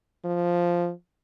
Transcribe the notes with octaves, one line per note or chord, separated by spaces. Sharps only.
F3